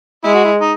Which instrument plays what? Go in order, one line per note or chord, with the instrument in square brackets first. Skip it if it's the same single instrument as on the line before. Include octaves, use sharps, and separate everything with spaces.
[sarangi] G#3 [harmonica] E4
[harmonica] F#4
E4
D#4